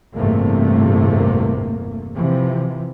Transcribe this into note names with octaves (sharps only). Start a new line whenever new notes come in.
G1 E2 A2 C3 A3 A#3
C3 E3 F3